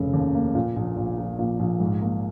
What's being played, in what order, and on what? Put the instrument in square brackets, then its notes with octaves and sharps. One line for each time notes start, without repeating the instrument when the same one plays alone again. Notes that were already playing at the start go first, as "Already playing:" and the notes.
Already playing: [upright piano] F1 C#3
D#2
A#3
A#2
A#1
A#1
F3
A#2
A#1
G#2
A#3